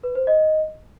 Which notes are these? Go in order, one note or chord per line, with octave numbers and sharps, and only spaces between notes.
B4
C5
D#5